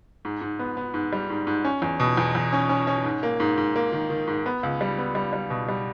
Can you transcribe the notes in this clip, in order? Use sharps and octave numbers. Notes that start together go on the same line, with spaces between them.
G#2
G#2
B3
B3
G#2
G3
G#2
G#2
C#4
E2
B2
E2
E2
C#4
C#4
C#4
G#2
A#3
G#2
G#2
A#3
D#3
D#3
G#2
B3
C#2
G3
B3
G3
G3
B2
G3